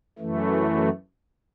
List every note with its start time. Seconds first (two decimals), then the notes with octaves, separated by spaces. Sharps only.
0.19 F#2 E3 A3